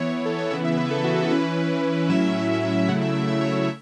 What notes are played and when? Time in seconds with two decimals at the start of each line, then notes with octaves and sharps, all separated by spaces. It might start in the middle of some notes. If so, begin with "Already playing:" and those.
Already playing: E3 B3 E4 C#5
0.12 C#5
0.26 A4
0.39 C#5
0.51 C#3 E3 B3 E4 E5
0.65 E5
0.77 B4
0.91 A4
1.04 F#4
1.18 A4
1.30 E3 C#4 E4 B4
2.09 A2 F#3 C#4 E4 E5
2.88 C#3 F#3 A3 E4 F#5
3.01 E5
3.15 E5
3.28 E5
3.41 C#5
3.55 E5